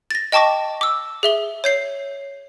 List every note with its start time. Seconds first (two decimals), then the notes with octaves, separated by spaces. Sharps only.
0.11 A6 A#6
0.32 D#5 G5 A5 C#6 D6 A#6
0.81 D6 E6
1.23 G#4 E5 G7
1.64 C#5 G6 C7